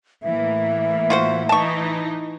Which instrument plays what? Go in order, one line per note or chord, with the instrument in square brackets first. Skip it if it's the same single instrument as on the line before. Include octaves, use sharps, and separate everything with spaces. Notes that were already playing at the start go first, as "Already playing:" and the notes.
[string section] A2 E3 A#3 [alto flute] E5
[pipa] F4 F#4 C5
[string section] E3 D#4 [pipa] A5 C#6